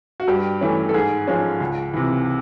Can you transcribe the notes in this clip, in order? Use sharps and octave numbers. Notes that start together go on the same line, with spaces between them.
F#4
G2 G4
E3 A3 C#4
A4
G#2 G#4
F3 G#3 C#4
C#2
C3 E3